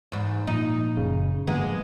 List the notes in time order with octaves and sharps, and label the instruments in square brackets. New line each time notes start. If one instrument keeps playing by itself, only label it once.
[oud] E2 G#2
[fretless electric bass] A#2 F3 [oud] D#4
[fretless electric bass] F#1 [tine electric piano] C#3
[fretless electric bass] G#2 D3 F3 [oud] G#3 A#3 [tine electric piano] B3